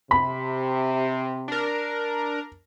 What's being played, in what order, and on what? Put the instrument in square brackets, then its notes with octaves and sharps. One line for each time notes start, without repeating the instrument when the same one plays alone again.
[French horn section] C3 [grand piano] B5
[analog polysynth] D4 A#4